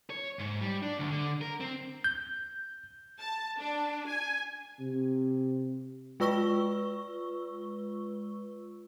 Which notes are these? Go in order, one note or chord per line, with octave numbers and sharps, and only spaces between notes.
C#5
G#2
G3
D4
D2
D3
A#4
C4
G6
A5
D4
G#5
C3
G#3 F4 B4 C#6 E6 G7